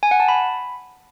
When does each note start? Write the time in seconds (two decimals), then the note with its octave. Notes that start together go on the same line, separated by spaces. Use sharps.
0.03 G#5
0.11 F#5
0.20 A5
0.28 B5